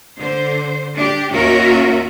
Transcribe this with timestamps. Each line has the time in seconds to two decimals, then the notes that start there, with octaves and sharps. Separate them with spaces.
0.16 D3 C5
0.95 D4 G4
1.32 D#2 C#4 F4 F#4 A#4 E5